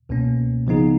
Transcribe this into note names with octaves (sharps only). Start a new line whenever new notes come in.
C#2 B2 A#3 C#4
C#3 F3 B3 D#4 G#4